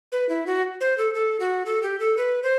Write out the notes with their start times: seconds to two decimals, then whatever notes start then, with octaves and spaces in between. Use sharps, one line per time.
0.12 B4
0.29 E4
0.47 F#4
0.81 C5
0.98 A4
1.14 A4
1.40 F#4
1.66 A4
1.83 G4
2.00 A4
2.17 B4
2.43 C5